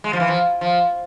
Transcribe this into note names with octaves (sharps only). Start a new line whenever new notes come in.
G#3
F3
E3
F3
F3